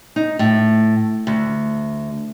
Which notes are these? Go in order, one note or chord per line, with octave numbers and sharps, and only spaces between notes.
D#4
A2
D2